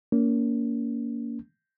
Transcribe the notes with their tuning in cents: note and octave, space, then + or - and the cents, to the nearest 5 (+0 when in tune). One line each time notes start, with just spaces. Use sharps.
A#3 +0 C#4 +40